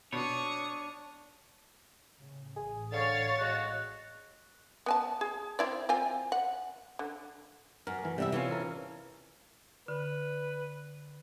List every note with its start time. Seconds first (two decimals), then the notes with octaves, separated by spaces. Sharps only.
0.12 B2 D4 C#5 C#6 D#6
2.20 A2 C#3
2.56 A1 G#4
2.92 D3 C#5 F5 A6
3.40 G#3 F#4
4.86 B3 G#5 A5
5.21 G#4
5.59 C4 E4 D5
5.89 C4 F4 G#5
6.32 F#5
6.99 D3
7.87 F#2 A#4
8.03 E3 A3
8.18 C3 G3 E4 E5
8.32 E3 C#4 F4
8.51 A4 A#4
9.88 D3 B4